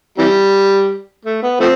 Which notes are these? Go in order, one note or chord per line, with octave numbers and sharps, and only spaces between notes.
C3 E3 G3
A3
B3
F3 A3 C4